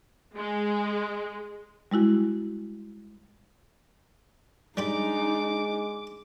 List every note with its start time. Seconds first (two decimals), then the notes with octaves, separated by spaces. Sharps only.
0.36 G#3
1.91 G3 G#3 E4 F#4
4.77 G3 G#3 D4 D#4 G5 B5 D6